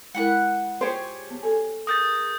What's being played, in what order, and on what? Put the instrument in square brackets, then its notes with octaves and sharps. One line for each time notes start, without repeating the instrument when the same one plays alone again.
[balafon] G#3 E4 A#4 [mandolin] F#5 B5 F#6
[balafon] F4 [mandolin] G4 G#4 C#5 [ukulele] C5
[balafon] B3
A4 G#5
[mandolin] G#4 A#4 [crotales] D#6 G6 A6